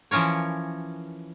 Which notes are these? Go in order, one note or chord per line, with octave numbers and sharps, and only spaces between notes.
E3 F3 C#4 A#4 C#5